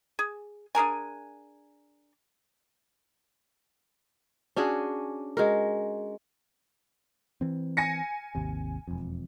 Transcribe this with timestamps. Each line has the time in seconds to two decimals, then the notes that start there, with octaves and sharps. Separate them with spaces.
0.19 G#4
0.75 D4 G#4 A#4 G#5
4.56 C#4 D4 F#4 G#4
5.37 G#3 F#4 A#4
7.41 E3 C4
7.77 G#5 A#6 C#7
8.35 G#1 D#2 C3
8.88 E1 F2